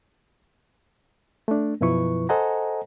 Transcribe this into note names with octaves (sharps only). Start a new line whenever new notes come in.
A3 D4
F#2 B2 F3 E4 B4 C#6
A4 C5 D#5 F#5 G#5 A#5